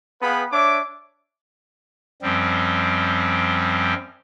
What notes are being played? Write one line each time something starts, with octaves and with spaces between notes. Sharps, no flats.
B3 G#4 B4 F5 G5 B5
D4 C#5 E5 D6
F#2 F3 G3 C4